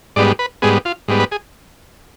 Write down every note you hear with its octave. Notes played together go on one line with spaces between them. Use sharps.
G#2 G3 B3 D5
B4
G#2 G3 B3 G#4
F4
G#2 G3 B3
B4
G#4